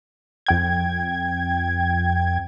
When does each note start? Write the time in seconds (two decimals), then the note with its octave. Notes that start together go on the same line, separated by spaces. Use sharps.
0.46 F2 G5 G#6